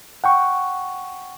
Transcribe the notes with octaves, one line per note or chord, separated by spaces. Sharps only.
F#5 G5 C#6